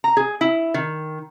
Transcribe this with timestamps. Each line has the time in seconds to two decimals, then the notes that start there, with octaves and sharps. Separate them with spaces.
0.04 A#5
0.17 G#4
0.41 E4
0.74 D#3